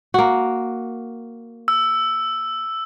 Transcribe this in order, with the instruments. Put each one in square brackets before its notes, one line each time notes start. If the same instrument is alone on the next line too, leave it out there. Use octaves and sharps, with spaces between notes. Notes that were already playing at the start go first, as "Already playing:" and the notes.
[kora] A#3 F#4
[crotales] E6